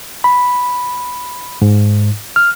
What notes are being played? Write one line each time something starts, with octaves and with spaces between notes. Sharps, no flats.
B5
G#2
F6